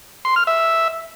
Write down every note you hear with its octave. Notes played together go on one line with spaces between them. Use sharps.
C6
F6
E5